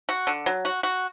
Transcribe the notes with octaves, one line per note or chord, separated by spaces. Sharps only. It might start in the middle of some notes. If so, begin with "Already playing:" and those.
F#4
D3
F#3
F#4
F#4